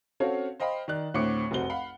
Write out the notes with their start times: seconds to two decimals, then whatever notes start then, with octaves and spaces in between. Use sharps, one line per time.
0.20 C4 C#4 F#4 A4 C#5 F5
0.60 C5 D#5 F5 G5 B5
0.88 D#3 D5 F#6
1.14 D2 A2 D3 C4 D6 C#7
1.51 F1 B1 C4 F#4 G7
1.70 F5 F#5 B5